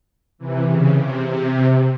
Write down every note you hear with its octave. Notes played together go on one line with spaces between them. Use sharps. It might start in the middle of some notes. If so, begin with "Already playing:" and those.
C3 E3
C#3
C3
C3